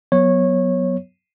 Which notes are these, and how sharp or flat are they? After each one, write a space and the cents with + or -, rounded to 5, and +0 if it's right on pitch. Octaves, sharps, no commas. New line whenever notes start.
F#3 -10 B3 +0 C#5 -15